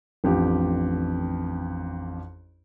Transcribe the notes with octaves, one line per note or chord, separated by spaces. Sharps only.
A1 F2 D4 G4